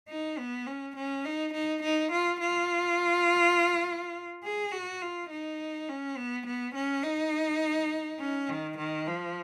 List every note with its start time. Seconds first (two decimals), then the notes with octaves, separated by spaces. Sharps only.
0.09 D#4
0.39 B3
0.67 C#4
0.96 C#4
1.25 D#4
1.54 D#4
1.83 D#4
2.12 F4
2.41 F4
4.44 G#4
4.72 F#4
5.02 F4
5.30 D#4
5.89 C#4
6.17 B3
6.47 B3
6.75 C#4
7.04 D#4
8.20 C#4
8.49 D#3
8.78 D#3
9.08 F3